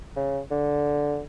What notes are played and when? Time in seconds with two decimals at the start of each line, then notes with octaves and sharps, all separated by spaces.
0.16 C#3
0.51 D3